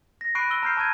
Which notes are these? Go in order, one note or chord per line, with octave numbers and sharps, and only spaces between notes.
A#6
B5 C#6 F#6 C7 D7 D#7
E6 G7
A#5 F6 G6 C7
A5 C#6 G6 G#6 D#7